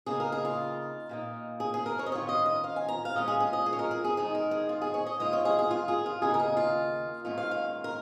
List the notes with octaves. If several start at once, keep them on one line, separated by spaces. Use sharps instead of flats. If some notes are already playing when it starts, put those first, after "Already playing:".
C#3 A#3 D#4 G#4
A#4
G#4
F4
A#2 A#3 D#4
G#4
G#4
A#4
C#5
D#5
D#3 C#4 F4 C#5
D#5
D#5
F5
G#5
A#5
F5
A#2 G#3 C#4 F4 D#5
G#4
G#4
D#5
G#4
C#5
A#4
G#4
G#4
D#3 G#3 D#4 G#4
A#4
G#4
F4
G#4
C#5
D#5
G#2 D#3 A#3 F4 D#5
C#5
G#4
G#4
F4
G#4
F4
D#2 C#3 A#3 D#4 G#4
A#4
G#4
F4
G#2 D#3 A#3 C#4 F4
F5
F5
A#4